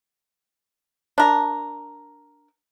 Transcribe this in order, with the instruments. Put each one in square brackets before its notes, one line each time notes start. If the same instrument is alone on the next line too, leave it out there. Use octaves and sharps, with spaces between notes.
[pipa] D4 A#4